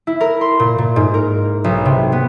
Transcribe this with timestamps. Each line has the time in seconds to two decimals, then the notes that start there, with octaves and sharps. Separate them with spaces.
0.07 E4
0.20 A#4
0.41 C6
0.59 A#2
0.78 A#2
0.96 G#2
1.14 A#4
1.64 B1
1.85 C3
2.12 B3